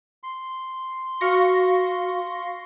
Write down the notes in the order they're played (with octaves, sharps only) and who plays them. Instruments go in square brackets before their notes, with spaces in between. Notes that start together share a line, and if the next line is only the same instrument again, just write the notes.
[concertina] C6
[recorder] F#4 [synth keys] F5 C#6 A#6